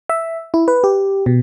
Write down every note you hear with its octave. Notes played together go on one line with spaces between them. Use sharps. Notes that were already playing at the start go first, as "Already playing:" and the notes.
E5
E4
B4
G4
B2